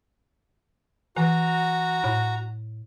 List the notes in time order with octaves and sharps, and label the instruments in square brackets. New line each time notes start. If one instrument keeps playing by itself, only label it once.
[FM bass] E3 [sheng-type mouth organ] F#4 A#5
[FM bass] A2